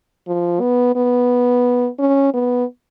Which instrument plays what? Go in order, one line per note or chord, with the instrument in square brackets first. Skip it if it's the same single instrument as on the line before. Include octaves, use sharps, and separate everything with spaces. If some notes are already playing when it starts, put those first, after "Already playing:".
[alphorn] F3
B3
B3
C#4
B3